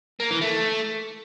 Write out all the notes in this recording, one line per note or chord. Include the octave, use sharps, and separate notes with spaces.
A#3
E3
A3